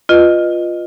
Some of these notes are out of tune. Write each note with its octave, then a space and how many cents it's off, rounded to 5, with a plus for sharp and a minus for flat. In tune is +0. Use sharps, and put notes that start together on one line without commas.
F4 +0 B4 +0 D#5 -15